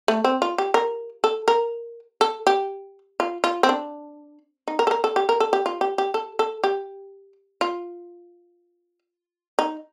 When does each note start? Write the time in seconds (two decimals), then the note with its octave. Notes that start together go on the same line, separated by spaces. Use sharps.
0.08 A3
0.24 C4
0.42 F4
0.58 G4
0.74 A#4
1.24 A4
1.48 A#4
2.21 A4
2.47 G4
3.20 F4
3.44 F4
3.63 C4
3.69 D4
4.68 D#4
4.79 A#4
4.87 A4
4.91 A#4
5.04 A4
5.16 G4
5.29 A#4
5.40 A4
5.53 G4
5.66 F4
5.81 G4
5.98 G4
6.14 A4
6.39 A4
6.64 G4
7.61 F4
9.59 D#4